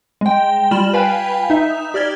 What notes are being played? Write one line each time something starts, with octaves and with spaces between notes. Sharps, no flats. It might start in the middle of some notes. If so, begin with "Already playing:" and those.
G#3 G5
G3 F4 F6 E7 F#7
B4 F5 G5 G#5 B5
D#4 E5
G4 D5 F6 G#6 G7